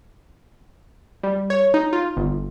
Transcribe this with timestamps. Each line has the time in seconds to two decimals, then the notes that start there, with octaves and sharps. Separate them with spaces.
1.23 G3
1.50 C#5
1.74 D#4
1.93 F4
2.17 G1